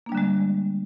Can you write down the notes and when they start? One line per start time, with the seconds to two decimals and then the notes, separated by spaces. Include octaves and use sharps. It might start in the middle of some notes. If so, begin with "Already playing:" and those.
0.06 A#3
0.09 D4
0.12 G3
0.15 D3
0.17 G#3